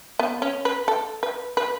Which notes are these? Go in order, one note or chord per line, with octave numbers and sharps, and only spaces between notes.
B3
C#4
B4
A4
B4
B4